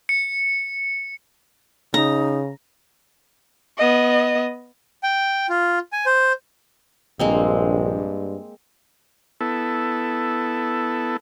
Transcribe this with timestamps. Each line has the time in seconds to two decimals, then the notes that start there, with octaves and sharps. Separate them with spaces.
0.09 C#7
1.94 C#3 D#4 A#5
3.78 B3 D#5
5.03 G5
5.49 F4
5.93 G#5
6.06 C5
7.20 A#1 G2 G#3 A#3 C4
9.41 B3 E4 A4